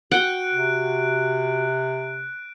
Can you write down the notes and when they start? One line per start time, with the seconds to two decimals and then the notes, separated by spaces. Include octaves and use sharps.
0.11 F#4 F#5 G5 F#6 D7
0.53 C3